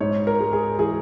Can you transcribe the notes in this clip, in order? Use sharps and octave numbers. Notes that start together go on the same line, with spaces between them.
G#2 C#5
A#4
G#3
G#4
E3 G#4